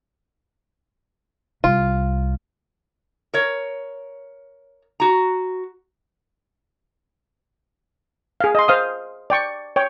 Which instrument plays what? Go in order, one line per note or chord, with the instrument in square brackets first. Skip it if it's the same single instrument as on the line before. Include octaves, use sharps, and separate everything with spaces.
[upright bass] C2 [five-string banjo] F4
[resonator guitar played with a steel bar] A#4 C#5
F#4 A#5
[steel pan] G#4 F5
D#5 C6
C5 F5 D#6
D5 G5 C#6
C#5 G5